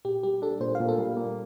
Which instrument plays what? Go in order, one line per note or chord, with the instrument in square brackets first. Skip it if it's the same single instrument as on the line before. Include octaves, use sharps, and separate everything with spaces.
[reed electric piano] A#2 [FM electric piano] G4
[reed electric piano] G3 [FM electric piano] G4
[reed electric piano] D4 [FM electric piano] A4
[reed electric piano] A#2 [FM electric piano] C5
[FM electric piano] F5
[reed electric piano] A#2
[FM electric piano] A4
[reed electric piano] G3
A#3